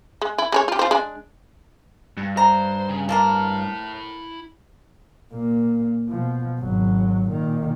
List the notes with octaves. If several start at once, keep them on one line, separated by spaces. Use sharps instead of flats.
G#3
E4
G#3 G#4 C#5
F4 G4
F4 C5
G#3 D4
G2
C5 A#5
C#3
F3 A#3 E4 A#4 A5
A#2 A#3
B2 F3
G#1 F#3
A#2 D#3